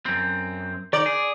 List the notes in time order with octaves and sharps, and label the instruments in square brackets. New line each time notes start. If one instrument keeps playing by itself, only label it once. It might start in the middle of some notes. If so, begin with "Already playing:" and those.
[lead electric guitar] F#2 C4
[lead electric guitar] D#3 [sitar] D5
[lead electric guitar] G#4